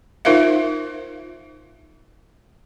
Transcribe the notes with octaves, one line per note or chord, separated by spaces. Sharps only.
D#4 F4 A#4 C5 E5 F5